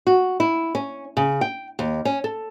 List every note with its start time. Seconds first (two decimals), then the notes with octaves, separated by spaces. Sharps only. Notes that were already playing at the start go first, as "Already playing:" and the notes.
0.07 F#4
0.40 E4
0.75 C#4
1.17 C#3
1.41 G5
1.79 D#2
2.05 C#4
2.24 A4